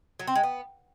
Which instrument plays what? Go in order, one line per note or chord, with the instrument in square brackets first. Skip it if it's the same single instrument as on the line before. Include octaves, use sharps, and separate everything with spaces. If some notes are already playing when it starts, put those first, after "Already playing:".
[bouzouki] F#3
C4
G#3
B3